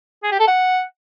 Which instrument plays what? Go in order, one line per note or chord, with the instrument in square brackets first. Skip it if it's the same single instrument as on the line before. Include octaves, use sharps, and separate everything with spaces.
[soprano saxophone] G#4
G4
A4
F#5